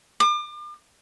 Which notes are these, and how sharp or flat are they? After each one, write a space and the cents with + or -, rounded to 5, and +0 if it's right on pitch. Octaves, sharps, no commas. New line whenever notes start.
D6 +40